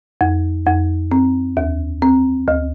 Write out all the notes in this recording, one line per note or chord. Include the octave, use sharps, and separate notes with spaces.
F2
F2
C4
D#2
C4
D2